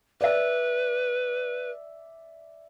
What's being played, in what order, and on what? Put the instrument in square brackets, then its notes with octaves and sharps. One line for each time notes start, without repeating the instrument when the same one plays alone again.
[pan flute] B4 [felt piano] D5 E5